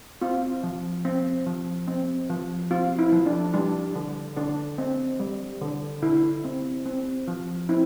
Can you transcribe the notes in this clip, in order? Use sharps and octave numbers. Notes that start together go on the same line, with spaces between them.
C4 F4
F3
C4
F3
C4
F3
C4 F4
E4
F3
D4
G3 D4
D3
D3 D4
C4
G3
D3
D3 E4
C4
C4
F3
C4 E4